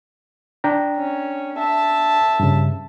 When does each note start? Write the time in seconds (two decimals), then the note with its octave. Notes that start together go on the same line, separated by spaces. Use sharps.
0.64 D4 G5 A#5
0.97 C#4
1.59 E5 A5
2.40 G2 C#3